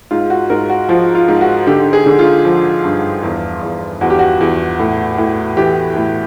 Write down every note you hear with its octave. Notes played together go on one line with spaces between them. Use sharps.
G#2 F4
F#4
G#2 A#4
F#4
F3 F4
F4
G#2
F#4
D3 G4
G#4
D3
F4
F3
G2
E2
E2
E2 F#4
G4
F#4
E2
A2
A2
E3 G4
A2